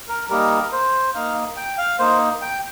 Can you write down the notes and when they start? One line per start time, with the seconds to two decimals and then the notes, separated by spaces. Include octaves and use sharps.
0.08 A#4
0.30 G3 A#3 D#4 A#4
0.72 C5
1.15 A#3 D#4 F5
1.57 G5
1.78 F5
1.99 A#3 D#4 C5
2.42 G5